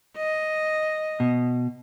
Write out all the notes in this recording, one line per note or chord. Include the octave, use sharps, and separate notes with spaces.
D#5
B2